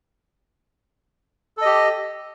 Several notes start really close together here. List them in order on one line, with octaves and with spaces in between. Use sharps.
A4 D#5 G4